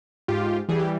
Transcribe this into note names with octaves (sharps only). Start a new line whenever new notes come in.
G#2 F4 G4
E3 G3 G#4
G4